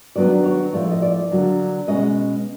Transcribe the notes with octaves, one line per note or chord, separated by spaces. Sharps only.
D#3 F#3 B3 D4 D5
C#5
A2 F3 A3 D5
D#5
D5
D3 F#3 A#3 D4
B2 G#3 C#4 D#5